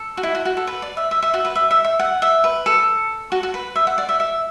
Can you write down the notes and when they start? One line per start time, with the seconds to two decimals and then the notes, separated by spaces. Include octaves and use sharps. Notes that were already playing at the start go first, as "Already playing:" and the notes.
Already playing: A4
0.17 F#4
0.23 E4
0.35 F#4
0.45 F#4
0.57 A4
0.67 B4
0.82 D5
0.97 E5
1.11 E5
1.23 E5
1.34 F#4
1.45 B4
1.56 E5
1.71 E5
1.84 E5
1.99 F#5
2.22 E5
2.44 B4
2.66 A4
3.32 F#4
3.43 F#4
3.54 B4
3.75 E5
3.87 F#5
3.98 D5
4.09 E5
4.20 E5